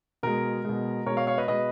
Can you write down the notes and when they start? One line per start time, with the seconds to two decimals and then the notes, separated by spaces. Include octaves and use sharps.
0.23 B2 G#3 A#4
0.65 B2 G#3
1.06 B2 A#4 C#5
1.09 G#3
1.17 C#5 F5
1.27 C#5 F5
1.38 B4 D#5
1.48 B2 G#3 B4 D#5